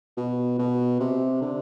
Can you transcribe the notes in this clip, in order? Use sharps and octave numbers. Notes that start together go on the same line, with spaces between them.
B2
B2
C3
D3